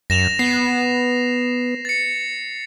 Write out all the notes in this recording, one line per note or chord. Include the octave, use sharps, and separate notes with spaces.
F#2 A#6 E7 F7
B3 C7
A6 C#7